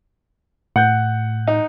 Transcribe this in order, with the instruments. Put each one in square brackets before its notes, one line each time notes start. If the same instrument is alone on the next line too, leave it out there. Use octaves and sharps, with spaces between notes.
[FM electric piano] A2 [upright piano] F#5 G6
[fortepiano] D#4